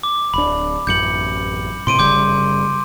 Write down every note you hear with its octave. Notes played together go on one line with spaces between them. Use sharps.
D6
D1 D4 B5
A1 F#2 G6 C#7 F#7
A2 C3 C6 D7 D#7
F#1 C#3 G3 D6 G6